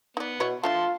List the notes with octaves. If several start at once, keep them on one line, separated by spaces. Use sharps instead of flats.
B3 D#4 D5
B2 E4 C#5
A3 D4 F4 E5 A5 C6